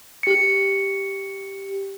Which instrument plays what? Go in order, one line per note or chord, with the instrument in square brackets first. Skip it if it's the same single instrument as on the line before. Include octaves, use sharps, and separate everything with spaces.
[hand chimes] G4 C#7